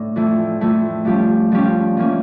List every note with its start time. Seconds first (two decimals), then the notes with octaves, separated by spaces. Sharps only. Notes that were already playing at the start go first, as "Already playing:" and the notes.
Already playing: A2 D4
0.16 F2 E3 A3 E4
0.61 F2 E3 A3 E4
1.05 G2 F3 C#4 G4
1.52 G2 F3 C#4 G4
1.97 E3 A#3 C#4